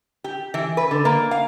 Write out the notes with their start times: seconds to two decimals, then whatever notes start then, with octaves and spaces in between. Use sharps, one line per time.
0.24 G4
0.54 E3
0.77 B4
0.91 D3
1.05 A#3
1.31 F5